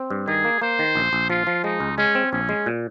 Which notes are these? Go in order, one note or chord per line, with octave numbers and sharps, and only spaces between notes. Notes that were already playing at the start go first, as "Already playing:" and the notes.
Already playing: C4
G2
D#3 G#4
A#3
A#3 C5
D#3
A#1
A#1
F3 F4
F3
G#3 D#4
C#2
G#3 C#4
C4
A#1 C#4
G#3
A#2